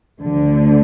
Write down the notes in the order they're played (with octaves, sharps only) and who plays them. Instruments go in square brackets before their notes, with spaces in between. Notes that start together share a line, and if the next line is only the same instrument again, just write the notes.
[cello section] D2 D3